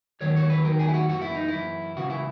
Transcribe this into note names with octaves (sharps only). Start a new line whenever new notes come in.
D#2 D#3 F#3 C#5
C#5
B4
D#2 D#3 F#3 A#4
G#4
E4
F#4
F#2 E3 F#4
E4
D#4
F#2 E3 E4
C#2 C#3 E3 F#4
E4